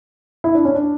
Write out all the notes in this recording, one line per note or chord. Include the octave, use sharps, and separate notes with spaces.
E4
D4
C#4
D4